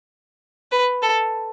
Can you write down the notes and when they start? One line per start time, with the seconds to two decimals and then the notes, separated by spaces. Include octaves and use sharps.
0.72 B4
1.02 A4